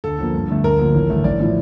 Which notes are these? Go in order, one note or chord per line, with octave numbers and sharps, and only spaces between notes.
D2 A4
D3 F3 A#3
G2
D3 A3
D2 A#4
D3 F3 A#3
A1
G2 D3 A3
A1 D5
A2 F3